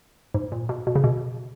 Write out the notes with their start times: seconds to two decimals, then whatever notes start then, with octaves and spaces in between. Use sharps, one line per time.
0.34 G#2
0.52 A#2
0.69 B2
0.87 B2
0.95 C#3
1.04 B2